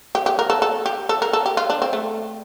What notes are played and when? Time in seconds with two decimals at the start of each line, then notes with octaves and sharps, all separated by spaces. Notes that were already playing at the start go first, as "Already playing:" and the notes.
0.15 G4
0.26 G4
0.39 A#4
0.50 A4
0.62 A4
0.86 G4
1.09 A4
1.22 A#4
1.33 A4
1.46 G4
1.57 F4
1.70 D4
1.82 C4
1.93 A3